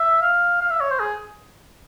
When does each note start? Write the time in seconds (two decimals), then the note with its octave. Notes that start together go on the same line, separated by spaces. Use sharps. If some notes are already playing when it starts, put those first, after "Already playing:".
Already playing: E5
0.22 F5
0.61 F5
0.70 E5
0.81 C#5
0.91 C5
1.00 G#4